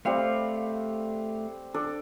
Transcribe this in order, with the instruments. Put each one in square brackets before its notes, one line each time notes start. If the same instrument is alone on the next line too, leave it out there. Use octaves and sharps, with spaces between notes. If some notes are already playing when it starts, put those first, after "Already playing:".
[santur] G3 C4 F#5 [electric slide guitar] A3 F5
[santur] D4 A4 D5